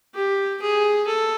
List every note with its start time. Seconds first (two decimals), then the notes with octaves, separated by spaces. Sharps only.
0.15 G4
0.61 G#4
1.07 A4